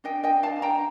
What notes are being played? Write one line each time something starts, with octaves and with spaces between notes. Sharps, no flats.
D4 D#5 G5
D#5 G5
D4
F5 A5
D4
G5 A#5